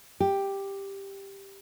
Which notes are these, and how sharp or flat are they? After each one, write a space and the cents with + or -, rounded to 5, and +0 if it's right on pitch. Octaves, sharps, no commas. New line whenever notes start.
G4 +5